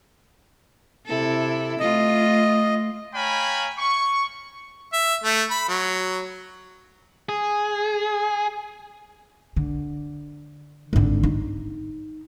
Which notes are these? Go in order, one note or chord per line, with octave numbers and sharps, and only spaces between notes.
C3 E4 A4
A3 F4 D#5
C#5 F5 G5 G#5 A#5 B5
C#6
E5
A3
B5
F#3
G#4
D3
G#1 D3
D#4